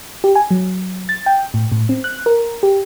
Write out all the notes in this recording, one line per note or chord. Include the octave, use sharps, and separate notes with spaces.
G4
G#5
F#3
A6
G5
A2
A2
C4
F#6
A#4
G4